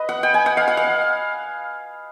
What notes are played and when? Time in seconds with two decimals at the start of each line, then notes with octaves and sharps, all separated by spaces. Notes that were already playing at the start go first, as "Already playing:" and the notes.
Already playing: B4 D#5
0.09 F#5
0.23 G5
0.34 G#5
0.46 F#5
0.57 F5
0.68 F#5
0.77 F5